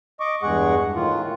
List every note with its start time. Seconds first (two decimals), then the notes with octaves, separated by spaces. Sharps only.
0.20 D#5 C#6 D6
0.43 E2 G2 G#3 G#4 F#5 C#6
0.95 A2 D#3 F4